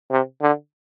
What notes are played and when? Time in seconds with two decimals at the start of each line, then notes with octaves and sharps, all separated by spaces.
0.11 C3
0.42 D3